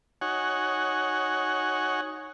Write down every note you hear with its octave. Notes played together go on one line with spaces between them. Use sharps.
D#4 F#4 C#5 F#5 G#5 C#6